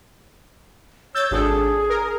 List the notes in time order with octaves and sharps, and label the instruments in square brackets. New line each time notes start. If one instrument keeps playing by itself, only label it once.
[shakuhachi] C#5 [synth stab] E6 G6 A6
[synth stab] G#1 D4 A4 [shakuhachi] G#4
[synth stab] A#4